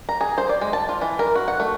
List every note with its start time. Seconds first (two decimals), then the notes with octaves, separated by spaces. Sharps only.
0.09 A#5
0.21 G#4
0.38 C5
0.49 D5
0.61 G#3
0.73 A5
0.89 F4
1.01 E3
1.19 A#4
1.35 F#4
1.48 F#5
1.60 A3